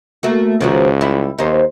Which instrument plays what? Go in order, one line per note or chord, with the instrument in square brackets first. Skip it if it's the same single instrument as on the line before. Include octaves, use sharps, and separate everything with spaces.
[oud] A3 A#3 F#4
[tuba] C#2 [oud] D#3 F3 F#4
[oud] G3 E4
[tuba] D#2 [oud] D#4 C5